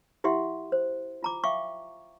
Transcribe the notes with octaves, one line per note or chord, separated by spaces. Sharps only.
E4 G4 E5 F#5 C6
C5
F4 A#5 D6
E5 F5 G5 C#6 D6